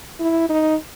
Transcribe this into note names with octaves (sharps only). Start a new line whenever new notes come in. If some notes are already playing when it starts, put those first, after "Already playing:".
E4
D#4